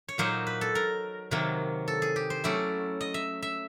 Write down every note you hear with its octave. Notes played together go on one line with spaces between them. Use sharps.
C#5
A#2 F#3 A#3 D#4 C5
B4
A4
A#4
C3 D#3 F#3 A#3
A4
G#4
G4
C5
F#3 A3 C#4 E4 D5
D#5
E5
E5